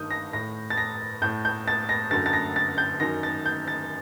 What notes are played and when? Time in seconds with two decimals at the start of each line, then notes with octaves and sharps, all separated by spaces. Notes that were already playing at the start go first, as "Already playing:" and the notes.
Already playing: G2 D#3 D#6 G6
0.11 A#6
0.33 A2 A#6
0.70 A6
0.77 A#6
1.22 A2 G6
1.45 G6
1.68 A6
1.89 A#6
2.11 F#2 D3 A6
2.26 A6
2.33 A#6
2.56 A6
2.78 G6
3.00 F#2 D#3 A#6
3.23 A6
3.46 G6
3.68 A6